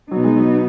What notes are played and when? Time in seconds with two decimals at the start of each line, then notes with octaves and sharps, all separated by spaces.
0.11 B2 F#3 B3 D#4
0.24 G#3
0.37 F#3